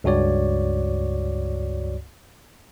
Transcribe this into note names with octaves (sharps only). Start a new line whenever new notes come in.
C#2 G2 F#4 C#5 D5